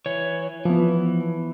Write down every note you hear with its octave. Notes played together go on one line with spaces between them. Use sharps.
E3 C#5
E3 F3 B3